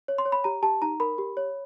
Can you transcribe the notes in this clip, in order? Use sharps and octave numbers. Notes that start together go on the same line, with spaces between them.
C#5
C6
C#5
B5
G4 A#5
G4 A5
D#4 A#5
A#4 B5
G4
C#5